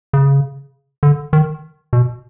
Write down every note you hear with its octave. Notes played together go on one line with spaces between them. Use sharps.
C#3
D3
D#3
B2